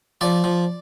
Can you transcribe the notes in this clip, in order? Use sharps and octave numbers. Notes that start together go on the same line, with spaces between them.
F3 D5
F3